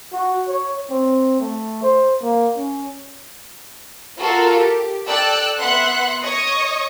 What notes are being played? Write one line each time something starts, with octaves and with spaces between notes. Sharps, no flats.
F#4
C#5
C4
A3
C5
A#3
C#4
F4 F#4 A4 A#4
G4
A4 D5 G5 E6 F#6
B3 E5 F#5 C6 F#6
C#5 D#5 C#6 D#6